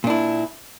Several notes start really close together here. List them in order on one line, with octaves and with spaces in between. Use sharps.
A#2 D4 E4